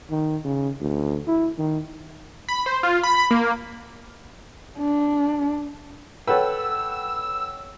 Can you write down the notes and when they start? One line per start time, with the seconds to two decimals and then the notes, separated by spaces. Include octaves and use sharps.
0.10 D#3
0.45 C#3
0.80 D2
1.27 E4
1.59 D#3
2.49 B5
2.66 C5
2.83 F4
3.03 B5
3.31 A#3
4.79 D4
6.27 A4 B4 C#5 F#5 G5 E6